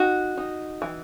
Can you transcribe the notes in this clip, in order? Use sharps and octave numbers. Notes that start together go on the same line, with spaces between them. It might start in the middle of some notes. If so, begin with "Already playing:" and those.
Already playing: D#4 F#4
D#4
E3